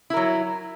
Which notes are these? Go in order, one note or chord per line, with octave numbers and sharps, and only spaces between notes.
F#3 E4 A#4